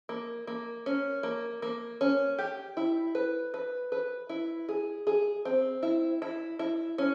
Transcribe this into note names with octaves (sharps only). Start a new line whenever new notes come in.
A#3
A#3
C#4
A#3
A#3
C#4
G4
E4
B4
B4
B4
E4
G#4
G#4
C4
E4
E4
E4
C#4